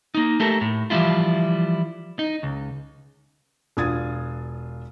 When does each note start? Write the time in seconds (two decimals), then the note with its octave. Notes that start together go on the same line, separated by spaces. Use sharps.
0.15 A#3 D#4
0.40 A3 G4 A4 A#4
0.61 A2
0.90 E3 F3 G3 A3 E4 F4
2.19 D#4
2.43 C#2
3.77 E1 D4 F4 D#6 G#6 A6